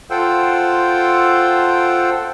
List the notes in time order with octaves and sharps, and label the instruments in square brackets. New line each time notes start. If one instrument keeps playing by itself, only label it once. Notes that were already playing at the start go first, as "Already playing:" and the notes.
[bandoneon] F4 A4 C5 F#5 G5 E6